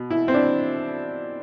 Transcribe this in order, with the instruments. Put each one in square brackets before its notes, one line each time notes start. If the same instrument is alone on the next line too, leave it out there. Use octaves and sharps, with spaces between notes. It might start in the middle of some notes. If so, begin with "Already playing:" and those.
Already playing: [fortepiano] B2
E4
C4
D4